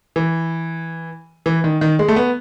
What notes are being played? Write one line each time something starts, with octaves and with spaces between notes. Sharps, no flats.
E3
E3
D#3
D#3
G#3
A3
B3